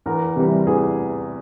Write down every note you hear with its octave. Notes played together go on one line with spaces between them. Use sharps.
E2 A#4
C3 E3 G3
E2 G#4